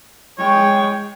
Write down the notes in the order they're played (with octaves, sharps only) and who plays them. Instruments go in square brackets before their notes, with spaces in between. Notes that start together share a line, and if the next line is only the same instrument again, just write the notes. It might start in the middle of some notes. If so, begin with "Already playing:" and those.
[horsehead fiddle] G#3 G5 [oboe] C#5